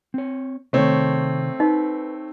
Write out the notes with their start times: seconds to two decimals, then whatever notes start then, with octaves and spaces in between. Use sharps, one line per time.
0.14 C4 C#5
0.73 C3 D#3 A3 C4 C#5
1.60 D#4 B4